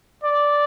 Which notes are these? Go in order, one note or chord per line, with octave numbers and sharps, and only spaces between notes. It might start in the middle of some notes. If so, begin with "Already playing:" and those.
D5